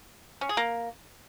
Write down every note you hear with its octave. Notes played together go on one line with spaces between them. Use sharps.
C#4
G#4
A#3